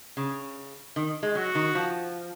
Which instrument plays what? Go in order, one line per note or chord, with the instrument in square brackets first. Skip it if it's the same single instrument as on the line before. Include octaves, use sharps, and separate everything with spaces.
[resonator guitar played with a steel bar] C#3
D#3
G#3
[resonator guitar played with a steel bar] F#3 [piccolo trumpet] F#4
[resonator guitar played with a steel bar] D#3
F3